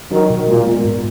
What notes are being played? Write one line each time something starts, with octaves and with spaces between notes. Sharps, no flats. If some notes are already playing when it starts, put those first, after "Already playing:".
D#3 F#3 D4
B2
A#2 G#3
B3
G#2